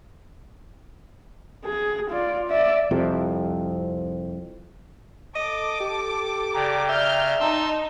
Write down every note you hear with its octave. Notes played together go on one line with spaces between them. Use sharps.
G#4
F4 D5
D5 E5
C2 F2 C3
A4 D#5 D6
G4
C#3 D5 G5 A#5
E5 F6 G6
D#4 A5 C6 E6